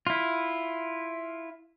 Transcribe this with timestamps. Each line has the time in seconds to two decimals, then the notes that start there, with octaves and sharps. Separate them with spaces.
0.07 E4 F4